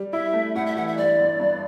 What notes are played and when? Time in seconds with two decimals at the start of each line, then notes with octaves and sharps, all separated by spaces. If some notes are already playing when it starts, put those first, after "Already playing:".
Already playing: G3
0.13 E4 E5
0.33 A3
0.55 A2 F#5
0.66 E5
0.76 E3 F#5
0.87 E5
0.97 G1 D5
1.18 G1
1.40 G2